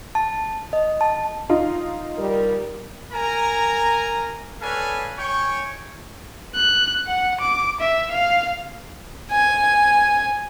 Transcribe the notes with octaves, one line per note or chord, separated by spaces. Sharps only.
A5
D#5
A5
D#4 F4
G3 A#4
A#4 G#5 A#5
A4 B4 C#5 D5 F5 G#5
C#5 G5 G#5 C#6
F#6
F#5
D6
E5
F5
G#5